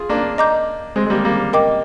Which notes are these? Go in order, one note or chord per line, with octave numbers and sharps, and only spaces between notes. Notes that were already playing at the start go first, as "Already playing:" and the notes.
Already playing: F4 G#4
A#3 D4
D#5 A#5 D6 G6
G#3 C4
G#3
G3 A#3
G3 A#3
A#4 D#5 G5 D6